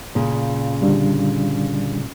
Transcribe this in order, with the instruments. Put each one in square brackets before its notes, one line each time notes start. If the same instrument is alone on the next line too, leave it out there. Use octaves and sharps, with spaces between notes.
[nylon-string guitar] A#2 C#3
[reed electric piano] D3 G3 D4